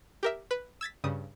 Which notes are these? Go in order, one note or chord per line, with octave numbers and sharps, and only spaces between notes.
G4 A#4 E5
B4
E6 G#6 A6 B6
G2 C#3 D#6